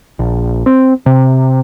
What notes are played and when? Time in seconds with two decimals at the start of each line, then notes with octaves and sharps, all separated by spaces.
0.19 A#1
0.66 C4
1.06 C3